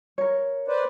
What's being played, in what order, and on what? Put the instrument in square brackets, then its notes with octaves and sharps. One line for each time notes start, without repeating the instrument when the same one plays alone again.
[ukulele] A#4 C#5
[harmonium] B4 C5 D5